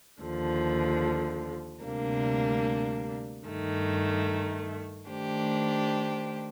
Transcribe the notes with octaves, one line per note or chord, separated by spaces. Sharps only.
D#2 D3 F3
D2 C3 G3 A#3 D4
G2 D#3 A3
D#3 A3 D4 G4 C5